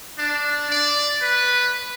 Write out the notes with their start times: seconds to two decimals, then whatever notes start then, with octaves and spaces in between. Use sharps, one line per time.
0.18 D4
0.70 D5
1.22 B4